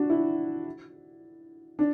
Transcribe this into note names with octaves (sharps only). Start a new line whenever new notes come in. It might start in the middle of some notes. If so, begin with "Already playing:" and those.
Already playing: D4 F#4
E4
D4